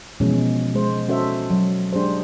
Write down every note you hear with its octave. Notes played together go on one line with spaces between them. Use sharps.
B2 E3 F3 G#3 C#4
G#3 C5
C#4 F#4 A4 C5 E5
F#3
G#3 D4 G4 G#4 C5